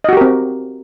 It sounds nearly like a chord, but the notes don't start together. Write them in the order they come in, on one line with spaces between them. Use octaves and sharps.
D#5 F#4 G4 A#4 C4